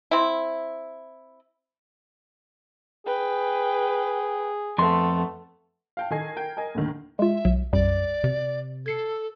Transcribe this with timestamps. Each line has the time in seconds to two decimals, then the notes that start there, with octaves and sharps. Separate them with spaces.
0.11 C4 E4
3.06 G#4 B4 G5
4.78 F2 A3 B3 C6
5.97 F5 G5 A5
6.10 D#3 A4 D#5 G#5 G#6 C7
6.36 A#4 G5
6.57 A#4 D#5 G#5
6.75 D#2 A2 D3 D#3
7.19 G#3 F4 E5
7.45 B1 F#3
7.73 B1 F#2 G3 D5
8.24 C3
8.86 A4 G#6 C7 C#7